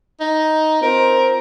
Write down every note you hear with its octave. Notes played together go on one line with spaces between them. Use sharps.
D#4
C4 F4 A#4 C5